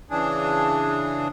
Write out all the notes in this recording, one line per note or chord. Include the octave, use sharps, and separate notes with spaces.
C#3 E3 D4 G#4